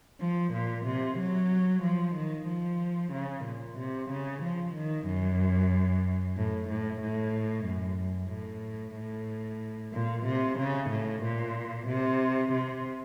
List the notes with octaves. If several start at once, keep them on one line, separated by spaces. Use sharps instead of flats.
F3
A#2
C3
F#3
F3
D#3
F3
C#3
A#2
C3
C#3
F3
D#3
F#2
A2
A2
A2
F#2
A2
A2
A#2
C3
C#3
A2
A#2
C3
C3